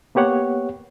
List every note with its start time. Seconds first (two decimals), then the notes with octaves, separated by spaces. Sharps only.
0.15 A#3 B3 G4 C#5 F#5